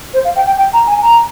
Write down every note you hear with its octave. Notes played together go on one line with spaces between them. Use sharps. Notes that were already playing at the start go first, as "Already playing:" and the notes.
C5
F5
G5
G5
G5
A#5
G#5
A#5